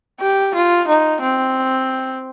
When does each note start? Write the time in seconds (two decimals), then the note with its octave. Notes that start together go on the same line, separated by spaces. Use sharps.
0.20 G4
0.55 F4
0.88 D#4
1.22 C4